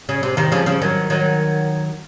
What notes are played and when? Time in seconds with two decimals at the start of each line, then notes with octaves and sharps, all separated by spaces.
0.09 C#3
0.23 C3
0.37 C3 D#3
0.52 C#3 F3
0.66 C#3 F3
0.82 D#3 F#3
1.10 D#3 F#3